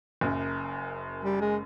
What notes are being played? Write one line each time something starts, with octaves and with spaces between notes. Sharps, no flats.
F#1 F#2
G3
G#3